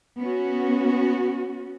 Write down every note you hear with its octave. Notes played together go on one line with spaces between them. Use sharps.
B3 C#4 F#4